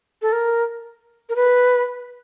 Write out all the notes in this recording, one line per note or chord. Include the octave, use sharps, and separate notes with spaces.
A4
A#4
A#4
B4